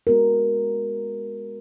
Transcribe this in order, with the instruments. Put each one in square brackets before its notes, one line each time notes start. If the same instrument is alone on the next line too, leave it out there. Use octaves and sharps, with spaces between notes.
[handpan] G#3 B3 F#4 A#4